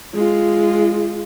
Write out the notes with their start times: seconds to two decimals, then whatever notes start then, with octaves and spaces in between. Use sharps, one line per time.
0.14 G#3 F4